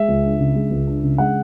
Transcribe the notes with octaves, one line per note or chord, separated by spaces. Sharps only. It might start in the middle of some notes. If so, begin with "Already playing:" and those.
Already playing: G#3 E5
C#2
D4
C#3
G#3
C#2
D4
C#3
G#3 F#5